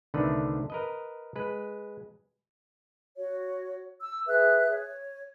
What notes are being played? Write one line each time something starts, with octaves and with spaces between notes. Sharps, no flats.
C2 D3 D#3 A3 D4 B4
A#4 B4 D#5
G#3 B4
F#4 C#5
E6
G#4 B4 E5 F#6
C#5